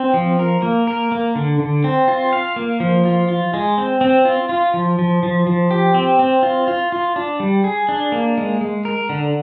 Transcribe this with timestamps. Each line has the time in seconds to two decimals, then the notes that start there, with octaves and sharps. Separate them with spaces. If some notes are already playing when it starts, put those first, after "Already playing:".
Already playing: C4
0.14 F3
0.39 A#4
0.62 A#3
0.87 A#4
1.12 A#3
1.35 D3
1.60 D3
1.84 C4
2.08 F4
2.33 F5
2.56 A#3
2.80 F3
3.05 F4
3.28 F4
3.54 G#3
3.78 C4
4.01 C4
4.25 F4
4.49 F4
4.74 F3
4.99 F3
5.23 F3
5.47 F3
5.71 G4
5.94 C4
6.19 C4
6.43 F4
6.68 F4
6.92 F4
7.16 D4
7.40 G3
7.64 G#4
7.89 D4
8.12 A#3
8.38 G#3
8.61 G#3
8.85 A#4
9.09 D3